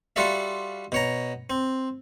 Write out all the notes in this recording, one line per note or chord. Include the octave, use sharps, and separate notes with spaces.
G3 F4 F#4 A4 D5 E5
B2 C#5 A#5
C4